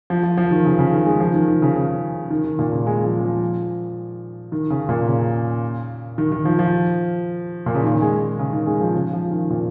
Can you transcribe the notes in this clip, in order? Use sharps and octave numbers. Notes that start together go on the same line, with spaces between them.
F3
F3
F3
D#3
C#3
C#3
D#3
G#3
F3
D#3
D#3
C#3
C#3
D#3
D#3
A#2
C#3
G#3
F3
F3
D#3
C#3
A#2
C#3
D#3
D#3
F3
F3
A#2
C#3
D#3
G#3
C#3
D#3
G#3
F3
C#3
F3
D#3
A#2